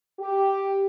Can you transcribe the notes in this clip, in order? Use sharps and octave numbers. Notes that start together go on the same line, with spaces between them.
G4